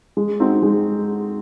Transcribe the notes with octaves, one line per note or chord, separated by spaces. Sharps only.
G#3
C4 D#4 F#4
G#3